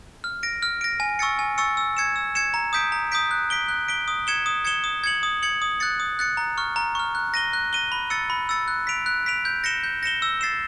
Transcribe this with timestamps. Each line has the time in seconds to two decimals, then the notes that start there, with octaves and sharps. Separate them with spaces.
0.24 F6
0.43 A#6 D7
0.62 F6
0.81 A#6 D7
1.00 G#5
1.19 C#6 E6 A6 C#7
1.39 G#5
1.58 C#6 E6 A6 C#7
1.77 E6
1.97 G#6 C#7 E7
2.16 E6
2.35 G#6 C#7 E7
2.54 A#5
2.73 D#6 G6 B6 D7
2.92 A#5
3.12 D#6 G6 B6 D7
3.31 F#6
3.50 B6 D7 G7
3.68 F#6
3.88 B6 D7 G7
4.08 D#6
4.27 G#6 C#7 E7 G7
4.46 D#6
4.65 G#6 C#7 E7 G7
4.84 D#6
5.04 G#6 C#7 F#7
5.23 D#6
5.42 G#6 C#7 F#7
5.62 D#6
5.80 F#6 A6 C#7
6.00 D#6
6.19 F#6 A6 C#7
6.37 A#5
6.58 C#6 F6
6.76 A#5
6.95 C#6 F6
7.15 F#6
7.34 A#6 D#7 G7
7.53 F#6
7.73 A#6 D#7 G7
7.92 B5
8.10 E6 A6 C#7
8.30 B5
8.49 E6 A6 C#7
8.68 F#6
8.87 B6 D7 F7
9.06 F#6
9.26 B6 D7 F7
9.45 G6
9.64 A#6 C#7 E7 G7
9.84 G6
10.03 A#6 C#7 E7 G7
10.22 E6
10.41 A6 C7 E7